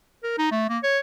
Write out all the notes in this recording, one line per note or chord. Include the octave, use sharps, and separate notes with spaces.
A#4
D#4
A3
A#3
C#5